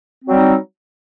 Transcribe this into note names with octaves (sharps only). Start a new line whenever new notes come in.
F#3 G3 C4 D#4